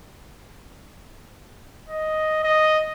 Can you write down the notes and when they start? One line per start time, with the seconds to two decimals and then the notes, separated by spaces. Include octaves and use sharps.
1.89 D#5
2.44 D#5